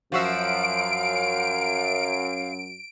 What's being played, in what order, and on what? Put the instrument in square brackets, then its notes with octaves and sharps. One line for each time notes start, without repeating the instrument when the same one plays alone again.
[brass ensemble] F#2 [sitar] F3 F#4 E5 [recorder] F5 [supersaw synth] D7